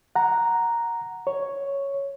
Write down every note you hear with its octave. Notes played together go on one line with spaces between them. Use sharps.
F#5 A#5
C#5